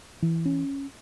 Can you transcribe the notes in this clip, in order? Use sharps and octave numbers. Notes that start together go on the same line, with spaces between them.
E3
C#4